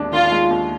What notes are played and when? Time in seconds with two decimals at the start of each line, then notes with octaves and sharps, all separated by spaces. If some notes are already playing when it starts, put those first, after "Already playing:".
Already playing: D#2 G#3 D4
0.12 D#3 F4
0.32 G#3
0.50 D#2